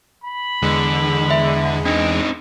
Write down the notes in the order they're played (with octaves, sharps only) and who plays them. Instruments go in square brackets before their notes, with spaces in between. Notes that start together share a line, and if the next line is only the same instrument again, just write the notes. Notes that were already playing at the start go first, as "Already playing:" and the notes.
[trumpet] B5
[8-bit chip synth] E2 G#3 [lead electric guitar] D3
[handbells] E5
[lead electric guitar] C4 D#4 [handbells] D4